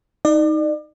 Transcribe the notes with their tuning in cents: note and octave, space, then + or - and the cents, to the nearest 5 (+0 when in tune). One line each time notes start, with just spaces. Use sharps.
D#4 +10 D5 +35